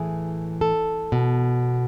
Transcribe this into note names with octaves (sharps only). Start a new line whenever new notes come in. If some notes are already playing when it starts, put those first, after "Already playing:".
Already playing: A2 E3 G#4
A4
B2